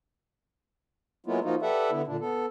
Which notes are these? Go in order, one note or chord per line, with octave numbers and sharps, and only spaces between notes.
F#3 G#3 A#3 B3 E4 F4
F3 A#3 D#4 F4 F#4
G4 A4 B4 D5 E5 F#5
D3 B3 E4
A#2 D3 D4
B3 A4